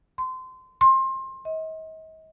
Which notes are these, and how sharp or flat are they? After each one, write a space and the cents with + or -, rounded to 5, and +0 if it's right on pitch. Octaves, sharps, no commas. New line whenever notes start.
C6 -25
C6 +25
D#5 +40